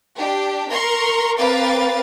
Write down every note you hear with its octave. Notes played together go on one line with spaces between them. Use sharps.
D4 G4
A#4 A#5 C6 C#6
C4 A#4 B4 F5 D6 A6